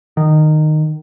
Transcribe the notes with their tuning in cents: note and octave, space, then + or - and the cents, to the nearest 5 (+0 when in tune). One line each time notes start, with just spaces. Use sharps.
D#3 -15